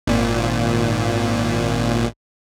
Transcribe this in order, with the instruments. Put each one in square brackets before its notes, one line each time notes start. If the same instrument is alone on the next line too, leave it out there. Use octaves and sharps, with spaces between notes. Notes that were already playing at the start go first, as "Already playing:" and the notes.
[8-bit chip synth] G#1 A#2